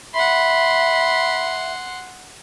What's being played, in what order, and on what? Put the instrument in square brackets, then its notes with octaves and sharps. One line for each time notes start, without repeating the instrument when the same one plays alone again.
[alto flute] E5 [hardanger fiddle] F#5 C6 [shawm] B5